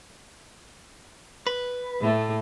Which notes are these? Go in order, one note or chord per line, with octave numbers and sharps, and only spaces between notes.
B4
A2 A3